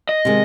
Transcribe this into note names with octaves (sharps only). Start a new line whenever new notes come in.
D#5
C3 D#3 G#3